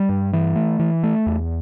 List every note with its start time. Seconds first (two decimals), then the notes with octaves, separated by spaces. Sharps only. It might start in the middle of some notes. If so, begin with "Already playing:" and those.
Already playing: G3
0.09 G2
0.33 E3
0.56 A3
0.79 E3
1.03 A3
1.26 E2